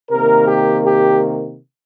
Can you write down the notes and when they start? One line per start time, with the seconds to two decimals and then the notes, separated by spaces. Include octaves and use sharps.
0.11 C3 D#3 A#3 A#4
0.48 G4
0.84 G4